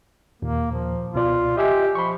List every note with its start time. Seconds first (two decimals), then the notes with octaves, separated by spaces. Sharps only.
0.42 D#2 A#2 A#3
0.72 F3
1.14 C#2 B2 F4 D5
1.57 G4 D#5 E5 G#5
1.95 F3 B5 C#6